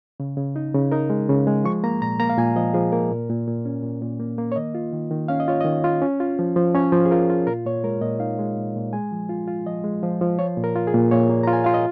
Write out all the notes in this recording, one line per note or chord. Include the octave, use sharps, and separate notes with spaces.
C#3
C#3
D#4
C#3
D#4 A#4
G#3
C#3
G#3
F3 C#6
A#3 A#5
A#2 A#5
A#3 A#5
F5
A#2 G#5
F3 D#5
F3 G#4
A#3 A#4
A#2
A#2
A#2
C#4
A#2
A#2
A#3
A#3
C#5
D#3 D#5
F4
D#3
D#3
C#4 F5
D#5
F4 C#5
D#3 D#5
F4
C#4
F4
F3
F3
C#4 C#5
F3
G#4
F4 A#4
F4
A#2 A#4
A#2 C#5
G#3 A#4
A#2 D#5
D#4 F5
G#3
A#2
A#2
G#3 G#5
F3
F4
F4
F3 D#5
G#3
F3
F3
F4 C#5
A#2
A#4
F4
G#4
A#2
A#2 C#5
A#3
F4 A#5
G#5
F4 F5
D#5